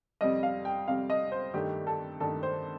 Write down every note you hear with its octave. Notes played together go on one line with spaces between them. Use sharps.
F2 C3 G3 D#5
F5
G5
F2 C3 G3 F5
D#5
C5
G2 D#3 A3 G4
A4
G2 D#3 A3 A4
C5